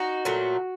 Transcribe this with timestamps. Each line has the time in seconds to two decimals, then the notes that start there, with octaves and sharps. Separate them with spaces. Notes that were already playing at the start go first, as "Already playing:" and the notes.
Already playing: D#4 F#4
0.25 A#2 F#3 A3